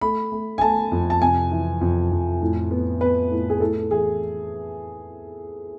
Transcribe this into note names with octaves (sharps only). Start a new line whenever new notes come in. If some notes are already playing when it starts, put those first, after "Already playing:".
A3 B5
A3
G#5
A3 A5
F2
A5
C3 G#5
E3
F2
F2
A2
B3
B3 B4
A2
G#4
A2 A4
E3 G#4